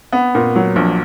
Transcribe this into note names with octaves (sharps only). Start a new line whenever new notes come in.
B3
A#2
F#3
A#1